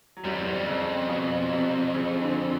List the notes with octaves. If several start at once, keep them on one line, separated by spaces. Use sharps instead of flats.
F#3
F#2 G3
F2
E2
F2
C#3
B2
C3
C#3
D3